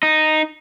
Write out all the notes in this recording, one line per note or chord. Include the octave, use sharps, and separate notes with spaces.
D#4